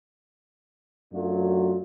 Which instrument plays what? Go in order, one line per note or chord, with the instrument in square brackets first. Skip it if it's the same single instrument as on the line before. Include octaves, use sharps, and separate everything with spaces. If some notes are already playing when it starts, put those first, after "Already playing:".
[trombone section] F#2 F#3 A3 D4 F4